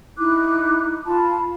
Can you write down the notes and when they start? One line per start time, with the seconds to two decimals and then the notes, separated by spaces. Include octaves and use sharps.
0.17 D#4 E4 D6 F#6
1.05 F4 A5 B5